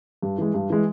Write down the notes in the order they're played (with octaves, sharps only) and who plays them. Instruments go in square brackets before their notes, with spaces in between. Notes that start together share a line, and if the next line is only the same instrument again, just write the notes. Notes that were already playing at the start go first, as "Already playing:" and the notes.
[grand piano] G2
E3 G#3
G2
E3 G#3